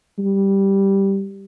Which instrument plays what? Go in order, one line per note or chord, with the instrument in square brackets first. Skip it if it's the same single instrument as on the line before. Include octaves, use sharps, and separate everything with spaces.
[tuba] G3